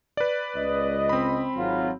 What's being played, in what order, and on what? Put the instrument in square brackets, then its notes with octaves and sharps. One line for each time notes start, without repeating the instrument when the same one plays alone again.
[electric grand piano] B4 D5
[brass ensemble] C#2 D#5
[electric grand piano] C4 B5
[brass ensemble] G#1 F#3 F4